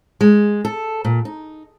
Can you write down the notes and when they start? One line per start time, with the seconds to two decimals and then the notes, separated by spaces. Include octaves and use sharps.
0.21 G#3
0.65 A4
1.05 A#2
1.25 D#4